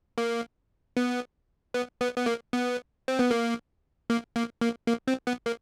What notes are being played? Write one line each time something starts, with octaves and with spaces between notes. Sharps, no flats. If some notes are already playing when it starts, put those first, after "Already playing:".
A#3
B3
B3
B3
B3
A#3
B3
C4
B3
A#3
A#3
A#3
A#3
A#3
C4
B3
A#3